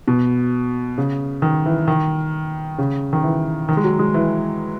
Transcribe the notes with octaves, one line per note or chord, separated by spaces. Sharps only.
B2
C#3
D#3
E3
D#3
C#3
D#3
E3
D#3
G#3
F#3
G#3
E3